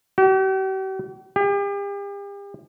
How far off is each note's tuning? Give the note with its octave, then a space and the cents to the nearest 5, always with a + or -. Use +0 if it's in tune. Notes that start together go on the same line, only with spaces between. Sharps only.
G4 -45
G4 +40